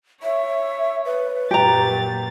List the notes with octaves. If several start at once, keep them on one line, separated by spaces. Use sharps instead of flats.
C#5 E5
B4
F#2 A#2 G4 A#5 A6